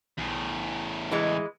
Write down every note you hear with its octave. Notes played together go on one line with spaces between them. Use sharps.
B1 E2 A2
E3 G#3